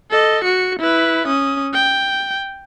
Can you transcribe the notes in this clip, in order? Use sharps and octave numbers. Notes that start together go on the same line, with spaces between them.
A4 D#5
F#4 C#7
E4 B4
C#4 D#6
G5